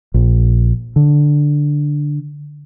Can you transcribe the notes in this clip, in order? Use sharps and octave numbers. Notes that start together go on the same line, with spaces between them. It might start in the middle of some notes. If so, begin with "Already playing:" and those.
A#1
D3